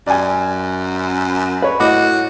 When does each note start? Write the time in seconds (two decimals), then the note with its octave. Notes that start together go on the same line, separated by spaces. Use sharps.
0.07 F#2 D5 G#5
1.62 B4 C#5
1.80 A2 F#4 D#5 D6